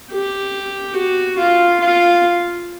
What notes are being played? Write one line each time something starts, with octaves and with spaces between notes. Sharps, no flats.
G4
F#4
F4
F4